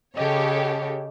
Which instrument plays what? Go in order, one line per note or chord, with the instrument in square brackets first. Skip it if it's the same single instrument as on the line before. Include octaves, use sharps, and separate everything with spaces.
[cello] C#3 [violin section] G4 A4 C#5 [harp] D#5